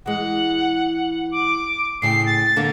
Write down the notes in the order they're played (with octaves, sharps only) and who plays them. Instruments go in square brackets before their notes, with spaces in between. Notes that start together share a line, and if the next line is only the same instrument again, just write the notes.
[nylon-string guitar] E3 G#3 [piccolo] F#5
[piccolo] D6
[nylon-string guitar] A2 C#3 G5 [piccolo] C7
[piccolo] A6
[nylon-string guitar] D3 A#3 F5